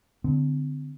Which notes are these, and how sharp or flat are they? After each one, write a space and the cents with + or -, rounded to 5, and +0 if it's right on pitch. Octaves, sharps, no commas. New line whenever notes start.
D3 +0 C4 -40